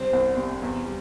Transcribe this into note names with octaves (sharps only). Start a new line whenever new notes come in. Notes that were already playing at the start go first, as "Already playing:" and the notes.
Already playing: C3 C4 D4
C2
C3
E2
G3